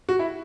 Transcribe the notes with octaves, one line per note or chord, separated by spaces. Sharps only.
F#4
E4